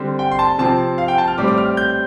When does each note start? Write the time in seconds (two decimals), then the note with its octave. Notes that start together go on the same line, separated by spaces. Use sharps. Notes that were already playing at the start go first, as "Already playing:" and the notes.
Already playing: D3 G3 C4
0.19 G5
0.32 C6
0.39 A5
0.58 C3 F3 C4 A5
0.98 F5
1.08 G5
1.18 A5
1.28 F6
1.38 A2 G3 C4 D6
1.48 D6
1.58 F6
1.77 G6